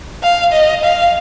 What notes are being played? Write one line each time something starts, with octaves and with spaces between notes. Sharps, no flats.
F5
D#5
F5